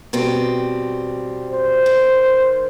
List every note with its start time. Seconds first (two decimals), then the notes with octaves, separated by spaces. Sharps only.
0.13 B2 G3 C4
1.52 C5
1.86 D#3